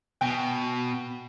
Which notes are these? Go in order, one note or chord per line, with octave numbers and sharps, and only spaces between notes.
B2 G5